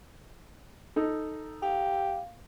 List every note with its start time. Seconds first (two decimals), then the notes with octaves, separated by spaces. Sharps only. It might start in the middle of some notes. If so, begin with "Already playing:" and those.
0.96 D#4 A4
1.63 G4 F5